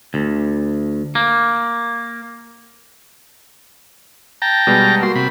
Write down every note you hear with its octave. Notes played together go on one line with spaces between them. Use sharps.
D2
A#3
G5 A5 A#5
B2 G3 G#3
A#3 F#4 C6
C3 B5